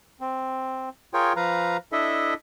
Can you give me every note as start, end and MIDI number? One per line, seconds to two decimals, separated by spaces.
0.21 0.89 60
1.14 1.33 65
1.14 1.33 68
1.14 1.33 70
1.14 1.33 73
1.14 1.33 79
1.36 1.77 53
1.36 1.77 71
1.36 1.77 77
1.36 1.77 82
1.92 2.34 62
1.92 2.34 64
1.92 2.34 69
1.92 2.34 75
1.92 2.34 76